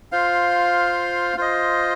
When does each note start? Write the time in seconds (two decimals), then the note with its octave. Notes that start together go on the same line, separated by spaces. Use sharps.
0.12 F4 C5 F5
1.37 F4 C5 D#5